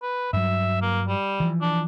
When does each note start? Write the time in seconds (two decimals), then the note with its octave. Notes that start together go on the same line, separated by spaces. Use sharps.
0.02 B4
0.33 G2 F#3 E5
0.82 A#3
1.08 G3
1.40 E3 F3
1.61 D4